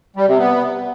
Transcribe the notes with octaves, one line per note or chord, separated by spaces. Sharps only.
G3
C3
B3